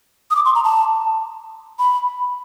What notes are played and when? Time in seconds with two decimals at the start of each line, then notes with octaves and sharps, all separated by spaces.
0.31 D#6
0.36 D6
0.45 C6
0.55 A#5
0.64 A5
1.79 B5